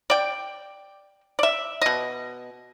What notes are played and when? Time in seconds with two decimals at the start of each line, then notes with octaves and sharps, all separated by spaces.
0.10 D5 G5
1.39 D5 E5
1.81 B2 D#5